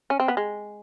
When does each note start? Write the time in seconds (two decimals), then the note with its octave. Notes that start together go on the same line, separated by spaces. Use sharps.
0.10 C#4
0.20 C4
0.28 B3
0.37 G#3